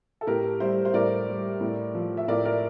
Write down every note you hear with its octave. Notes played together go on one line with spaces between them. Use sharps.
A4
A2 G4 A#4
G3 C5 E5
C5
A2 A#4 D5
G3
A2
F3
E5
A2 A#4 D5
A#4 D5